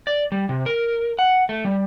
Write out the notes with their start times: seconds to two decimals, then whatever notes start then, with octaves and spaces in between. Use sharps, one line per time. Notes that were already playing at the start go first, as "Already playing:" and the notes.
0.07 D5
0.32 G3
0.49 C3
0.66 A#4
1.19 F#5
1.49 A3
1.65 G3